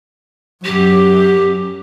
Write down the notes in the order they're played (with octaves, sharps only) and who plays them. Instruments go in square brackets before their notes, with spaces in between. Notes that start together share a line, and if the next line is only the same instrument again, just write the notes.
[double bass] F#2 [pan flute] G4